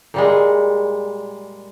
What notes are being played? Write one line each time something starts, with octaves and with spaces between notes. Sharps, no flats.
A#2 G3 G#3